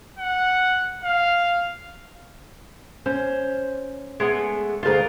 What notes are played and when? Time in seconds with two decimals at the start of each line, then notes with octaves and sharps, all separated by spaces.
0.19 F#5
1.04 F5
3.06 C#4 C5
4.20 G#3 A3 B3
4.83 D2 F4 G#4 A#4 F5